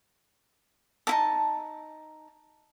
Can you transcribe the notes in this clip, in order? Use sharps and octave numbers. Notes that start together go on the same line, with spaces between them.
D#4 E4 A5